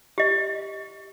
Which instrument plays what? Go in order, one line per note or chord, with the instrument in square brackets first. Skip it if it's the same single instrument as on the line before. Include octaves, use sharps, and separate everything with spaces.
[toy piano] G4 D#5